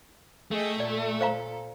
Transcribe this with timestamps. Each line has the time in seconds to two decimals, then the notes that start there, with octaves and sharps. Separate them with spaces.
0.51 A3 G#4 D#5 G5
0.80 A#2 A4 D5
1.21 C5 F5 A#5